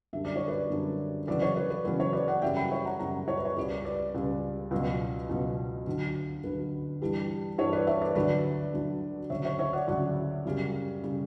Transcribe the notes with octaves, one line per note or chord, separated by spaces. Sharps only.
F#2 D3 G3 E5
D5
C#5
B4 D5
F#2 D3 G3
E2 C#3 F#3 B4 D5
C#5
B4
B4
E2 C#3 F#3 B4
C#5
B4 D5
D5 F#5
F#2 C#3 G3 E5 G5
G5 B5
C#5 E5
F#5 A#5
F#2 C#3 G3 F#5 A#5
C#5
B4
C#5
C#2 C#3 G3 B4 D5
B4 D5
C#2 C#3 G3
C#2 B2 F#3
C#2 B2 F#3
D2 D3 F#3
D2 D3 F#3 B4
G2 E3 G3
G2 E3 G3 C#5
B4 D5
C#5 E5
B4 D5
D2 D3 F#3 B4 D5
D2 D3 F#3
D2 C#3 F#3 C#5 E5
C#5 E5
C#5 E5
D5 F#5
D2 C#3 F#3 D5 F#5
F#2 C#3 G3
C#3 G3